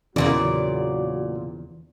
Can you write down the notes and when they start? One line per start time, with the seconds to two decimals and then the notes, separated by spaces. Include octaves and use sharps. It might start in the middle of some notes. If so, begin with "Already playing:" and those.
0.16 E2 A#2 C#3 E3 F#3 B3 F#4 D5